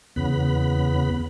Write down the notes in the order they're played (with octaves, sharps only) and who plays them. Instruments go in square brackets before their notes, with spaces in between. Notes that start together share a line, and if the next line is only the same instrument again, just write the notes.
[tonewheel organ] E2 C#3 B3 B5